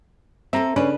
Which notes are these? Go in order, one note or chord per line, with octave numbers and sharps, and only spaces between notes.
C4 A4 E5 A#5
C#3 C#4 D4 B4